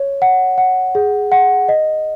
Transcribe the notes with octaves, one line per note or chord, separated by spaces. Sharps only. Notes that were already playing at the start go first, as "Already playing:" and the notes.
Already playing: C#5
F#5
F#5
G#4
F#5
D#5